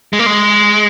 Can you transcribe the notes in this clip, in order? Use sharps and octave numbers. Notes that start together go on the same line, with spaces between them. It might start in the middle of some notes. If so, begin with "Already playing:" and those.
G#3
A#3
G#3